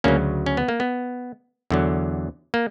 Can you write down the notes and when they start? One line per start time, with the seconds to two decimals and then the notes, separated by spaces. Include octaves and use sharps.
0.04 D2 C#3 F#3 A#3 C#4
0.46 C#4
0.57 B3
0.68 A#3
0.80 B3
1.71 E2 D3 F#3
2.54 A#3